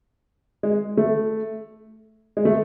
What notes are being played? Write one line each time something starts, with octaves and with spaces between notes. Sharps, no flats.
G#3
A3
G#3
A3